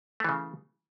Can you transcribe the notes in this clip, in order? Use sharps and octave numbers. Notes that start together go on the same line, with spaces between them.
C#3 E3 A3